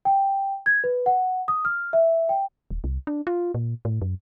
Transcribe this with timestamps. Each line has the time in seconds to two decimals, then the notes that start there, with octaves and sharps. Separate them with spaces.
0.05 G5
0.66 G#6
0.84 B4
1.06 F#5
1.48 D#6
1.65 F6
1.93 E5
2.29 G5
2.71 D#1
2.84 C2
3.07 D4
3.27 F4
3.54 A#2
3.85 A2
4.02 F#2